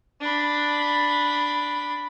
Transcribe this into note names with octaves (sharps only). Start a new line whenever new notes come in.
D4 B5